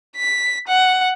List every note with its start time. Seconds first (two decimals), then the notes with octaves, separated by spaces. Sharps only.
0.16 B6
0.68 F#5